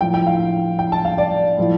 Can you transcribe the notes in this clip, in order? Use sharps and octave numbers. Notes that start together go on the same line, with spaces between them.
A2 F3 G5
G5
F5
G5
A5
F5
D5
A2 F3